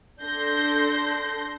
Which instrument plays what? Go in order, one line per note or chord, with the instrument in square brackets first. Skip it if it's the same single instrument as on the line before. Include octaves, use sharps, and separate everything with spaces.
[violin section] D4 A4 C6 G6 A#6